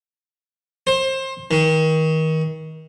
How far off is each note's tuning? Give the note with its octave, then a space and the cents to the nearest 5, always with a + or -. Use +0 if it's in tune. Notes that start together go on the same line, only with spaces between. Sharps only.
C5 +25
D#3 +30